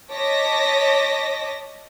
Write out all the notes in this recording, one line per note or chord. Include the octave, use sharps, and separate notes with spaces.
C#5 D#5 A5 D6 A#6 B6